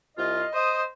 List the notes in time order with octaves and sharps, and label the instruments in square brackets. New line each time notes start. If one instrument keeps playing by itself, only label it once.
[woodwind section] C2 F4 [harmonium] D#5
[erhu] C5 [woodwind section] D#6